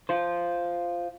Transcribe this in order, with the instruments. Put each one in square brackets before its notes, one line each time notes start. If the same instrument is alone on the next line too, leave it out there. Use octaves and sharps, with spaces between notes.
[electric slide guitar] F4 C5